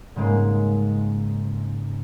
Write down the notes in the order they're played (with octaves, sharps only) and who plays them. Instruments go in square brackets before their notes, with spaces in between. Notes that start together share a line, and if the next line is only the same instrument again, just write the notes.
[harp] G#2 C#3 G#3 A#3